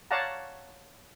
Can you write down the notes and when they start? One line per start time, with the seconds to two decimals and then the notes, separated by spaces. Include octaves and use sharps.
0.11 C#5 D5 F5 F#5 A5 A#5